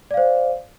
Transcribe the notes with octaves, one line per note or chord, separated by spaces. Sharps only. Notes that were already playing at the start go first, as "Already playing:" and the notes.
C5 D5 F5